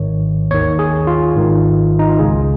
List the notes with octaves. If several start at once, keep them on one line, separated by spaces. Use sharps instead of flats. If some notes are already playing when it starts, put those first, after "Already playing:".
Already playing: G#1 G#2 D#3 C#5
D#2 D#3 C#5
G#4
F4
G#1 G#2 D#3
D#4
F4
C#2 C#3 G#4